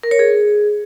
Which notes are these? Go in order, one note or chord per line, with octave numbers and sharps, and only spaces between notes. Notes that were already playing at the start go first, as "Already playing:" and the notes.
A#4
C#5
G#4